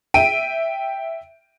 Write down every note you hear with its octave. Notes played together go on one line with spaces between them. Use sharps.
E5 G5 D7 D#7